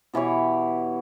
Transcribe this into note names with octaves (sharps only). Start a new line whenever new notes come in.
B2 E3 G4 C#5